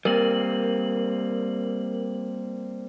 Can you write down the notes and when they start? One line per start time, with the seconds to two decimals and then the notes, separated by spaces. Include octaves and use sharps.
0.05 G3 A#3 C4 A#4 F#7